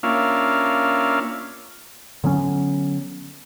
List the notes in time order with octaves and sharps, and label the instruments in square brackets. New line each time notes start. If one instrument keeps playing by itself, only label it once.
[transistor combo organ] A#3 C#4 D4 F4 E5 F5
[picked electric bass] D3 F#3 B3 C#4